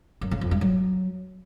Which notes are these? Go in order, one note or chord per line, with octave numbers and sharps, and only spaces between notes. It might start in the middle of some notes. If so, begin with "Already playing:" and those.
F#2
C#3
F2
G2
F#3